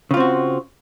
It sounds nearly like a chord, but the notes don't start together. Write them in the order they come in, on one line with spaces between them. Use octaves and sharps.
C#3 F4 C4 F#4